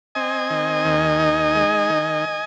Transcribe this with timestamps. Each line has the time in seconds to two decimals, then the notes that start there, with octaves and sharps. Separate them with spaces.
0.15 C4 D#5 G#5
0.50 D#3
0.85 D#2
1.19 D#4
1.55 G#3
1.89 D#3